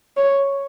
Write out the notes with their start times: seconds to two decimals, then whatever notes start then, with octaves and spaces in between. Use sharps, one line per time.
0.17 C#5